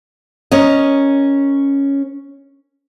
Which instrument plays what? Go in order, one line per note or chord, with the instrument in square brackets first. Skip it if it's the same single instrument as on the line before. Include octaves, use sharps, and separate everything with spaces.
[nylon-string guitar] C#4 A#4 D#5